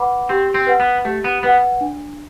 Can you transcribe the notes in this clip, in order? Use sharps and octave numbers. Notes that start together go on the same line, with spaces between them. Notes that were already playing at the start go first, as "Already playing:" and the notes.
Already playing: B4 F#5 B5 D6
C4 G4
C4
B4 F#5
B3
A3 G4
B3
B3 B4 F#5
D4